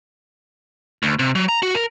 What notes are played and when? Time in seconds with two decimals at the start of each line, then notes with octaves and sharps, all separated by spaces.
1.03 D2
1.19 C3
1.35 F#3
1.49 A#5
1.63 F#4
1.75 A#4